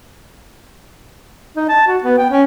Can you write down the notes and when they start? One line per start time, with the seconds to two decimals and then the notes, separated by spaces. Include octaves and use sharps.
1.56 D#4
1.69 A5
1.87 F#4
2.03 B3
2.18 G5
2.31 C#4